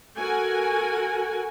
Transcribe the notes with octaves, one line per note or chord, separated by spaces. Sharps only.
F#4 A4 A#4 F#5 G#5